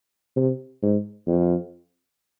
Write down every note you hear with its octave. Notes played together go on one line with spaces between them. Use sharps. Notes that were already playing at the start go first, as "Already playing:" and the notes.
C3
G#2
F2